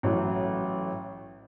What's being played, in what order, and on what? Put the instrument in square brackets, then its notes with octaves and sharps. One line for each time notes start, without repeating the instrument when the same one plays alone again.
[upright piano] A1 A2 F#3